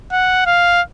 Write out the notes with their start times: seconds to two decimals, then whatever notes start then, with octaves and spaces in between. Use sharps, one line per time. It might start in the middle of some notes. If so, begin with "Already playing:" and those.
0.12 F#5
0.46 F5